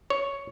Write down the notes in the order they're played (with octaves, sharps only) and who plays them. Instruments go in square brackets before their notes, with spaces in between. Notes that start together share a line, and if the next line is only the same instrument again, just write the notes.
[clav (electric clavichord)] C#5